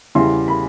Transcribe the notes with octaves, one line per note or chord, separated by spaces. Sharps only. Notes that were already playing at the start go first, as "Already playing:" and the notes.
E2 C#3 E3 G3 C6
B5